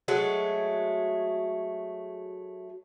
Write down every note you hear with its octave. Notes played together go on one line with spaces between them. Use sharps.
F#3 G#3 A3 F#4